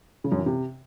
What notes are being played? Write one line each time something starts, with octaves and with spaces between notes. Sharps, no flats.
C#3
F#2
E3
C3